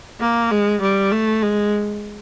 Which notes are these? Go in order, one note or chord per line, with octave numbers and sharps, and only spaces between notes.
A#3
G#3
G3
A3
G#3